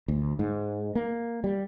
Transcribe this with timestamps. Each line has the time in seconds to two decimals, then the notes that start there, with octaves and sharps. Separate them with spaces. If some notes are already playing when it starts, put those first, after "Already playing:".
0.08 D2
0.39 G#2
0.95 A#3
1.44 G3